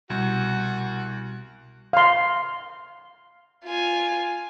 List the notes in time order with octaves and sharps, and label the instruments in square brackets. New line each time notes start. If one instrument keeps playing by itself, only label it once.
[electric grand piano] C2 [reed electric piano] B2 G3 [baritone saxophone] F#4
[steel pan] F5 C6
[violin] F4 G#5